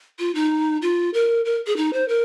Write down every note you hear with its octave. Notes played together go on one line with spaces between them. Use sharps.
F4
D#4
F4
A#4
A#4
G#4
D#4
C5
A#4